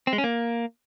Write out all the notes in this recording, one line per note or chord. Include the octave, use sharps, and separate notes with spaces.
C4
G#3
C#4
A#3